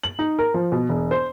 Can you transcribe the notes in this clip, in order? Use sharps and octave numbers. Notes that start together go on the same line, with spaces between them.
F#7
D#4
A#4
F3
B2
E1
C5